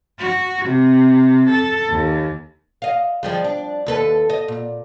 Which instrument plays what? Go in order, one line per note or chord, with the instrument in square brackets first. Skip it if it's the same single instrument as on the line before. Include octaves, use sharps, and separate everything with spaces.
[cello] F#4
C3
A4
D#2
[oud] D#5 F5
F3 G3 G#3
D4
D#2 A4 B4
D#5
A#2